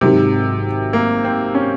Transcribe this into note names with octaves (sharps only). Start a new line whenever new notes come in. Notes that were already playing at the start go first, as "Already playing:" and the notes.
G#1 G#2 C3 D#3 F#3 C4
A#3
C4
C#4